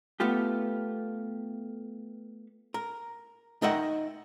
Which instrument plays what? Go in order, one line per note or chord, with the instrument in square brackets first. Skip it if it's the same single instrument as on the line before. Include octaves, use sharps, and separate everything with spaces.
[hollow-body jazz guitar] A3 B3 F4 G4
A#4
D#4 A#4 D#5 E5 F#5 G5